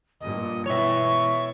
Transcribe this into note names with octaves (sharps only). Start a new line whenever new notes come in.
G2 A#2 D#5
B2 E3 C#5 E5 C#6